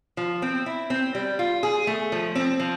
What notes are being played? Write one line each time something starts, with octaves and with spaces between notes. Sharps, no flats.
F3
C4
E4
C4
G3
F4
G#4
A3
F3
C4
F3